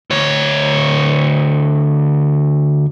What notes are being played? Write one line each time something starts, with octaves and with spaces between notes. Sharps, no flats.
D2 C#5